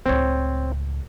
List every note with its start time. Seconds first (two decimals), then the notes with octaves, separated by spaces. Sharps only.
0.06 C#2 A2 C4 C#5